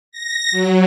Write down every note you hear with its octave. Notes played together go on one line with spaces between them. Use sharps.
A#6
F#3